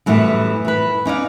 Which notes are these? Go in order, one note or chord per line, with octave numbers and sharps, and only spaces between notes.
F#2 A2 E3 G3 B3
E3 B4
C#4 D#4 D5 F5